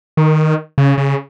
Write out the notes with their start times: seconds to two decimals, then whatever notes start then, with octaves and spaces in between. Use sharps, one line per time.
0.17 D#3
0.78 C#3
0.98 C#3